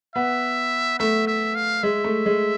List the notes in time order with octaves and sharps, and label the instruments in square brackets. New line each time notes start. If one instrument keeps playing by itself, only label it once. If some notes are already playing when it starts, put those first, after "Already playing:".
[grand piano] B3 [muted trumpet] E5
[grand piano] A3 [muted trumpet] E5
[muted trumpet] E5
F5
[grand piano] G#3 [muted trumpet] E5
[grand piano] A3
G#3